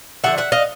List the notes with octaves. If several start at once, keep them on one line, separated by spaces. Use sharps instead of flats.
D3 F3 A3 E5 F#5
E5 F#5
D#5 F5